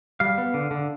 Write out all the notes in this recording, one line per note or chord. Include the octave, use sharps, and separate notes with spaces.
G3 F5
B3
D3
D3